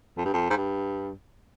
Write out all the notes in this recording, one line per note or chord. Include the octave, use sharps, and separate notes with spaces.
F2
G2
F2
G#2
G2